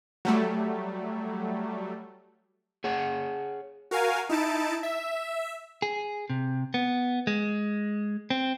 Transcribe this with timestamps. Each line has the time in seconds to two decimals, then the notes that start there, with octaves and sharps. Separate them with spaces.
0.25 F#3 G3 A3
2.84 G#4 C#5 F#5
3.91 F#4 A#4 F5 G#5
4.29 D#4 E4 A5 D7
4.83 E5
5.82 G#4
6.30 C3
6.74 B3
7.27 G#3
8.30 C4